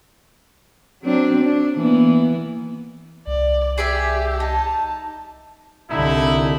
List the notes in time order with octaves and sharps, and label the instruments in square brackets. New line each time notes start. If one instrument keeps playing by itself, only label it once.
[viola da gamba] F#3 C4 D4
D4
E3 A#3 B3
[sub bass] C2 [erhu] D5
[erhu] G4 [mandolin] G#4 D5 E5
[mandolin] D#4 [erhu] A5
[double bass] C2 D3 [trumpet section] A3 D#4 E4